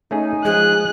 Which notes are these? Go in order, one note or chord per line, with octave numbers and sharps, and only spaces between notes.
A3 C#4 D#4 G#4 G#5
F3 G#3 G#4 F#6